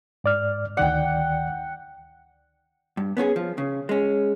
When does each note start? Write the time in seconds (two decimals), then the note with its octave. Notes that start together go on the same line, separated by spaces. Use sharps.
0.24 G#2 D5 F6
0.77 D2 D#3 D5 F#5 G5
2.97 G2
3.17 B3 C#4 F4 G#4
3.36 F3
3.58 C#3
3.89 G#3 C#4